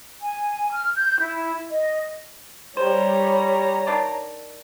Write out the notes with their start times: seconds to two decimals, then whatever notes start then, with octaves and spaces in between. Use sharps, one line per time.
0.21 G#5
0.72 F6
0.96 G6
1.21 E4
1.70 D#5
2.77 G3 C5 C#5 A#5
3.87 D#3 D4 D5